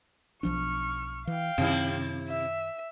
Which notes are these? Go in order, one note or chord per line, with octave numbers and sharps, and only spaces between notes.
B1 F3 D4 C#6 F6
E3 F5 G5
F#2 C3 D#3 E4
E5